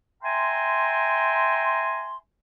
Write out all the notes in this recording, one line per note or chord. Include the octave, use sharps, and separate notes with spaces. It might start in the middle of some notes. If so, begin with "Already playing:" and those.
E5 G5 G#5 A#5 C6